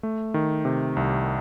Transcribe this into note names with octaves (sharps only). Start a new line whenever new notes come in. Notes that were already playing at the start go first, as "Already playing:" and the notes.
A3
D#3
C3
C2